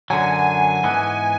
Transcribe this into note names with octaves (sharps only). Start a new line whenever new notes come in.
F#2 D3 F#3 G#5
G#2 E3 B3